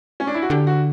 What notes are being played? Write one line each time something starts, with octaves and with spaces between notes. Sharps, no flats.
C#4
D4
E4
F#4
D3 G4
F#4